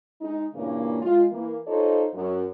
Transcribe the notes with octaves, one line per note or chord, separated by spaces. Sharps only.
G#3 D#4
G2 A#2 C#3 E3 A#3 C#4
G#3 F4
E3 A#3
D#4 F4 A4 C5 C#5 D#5
F#2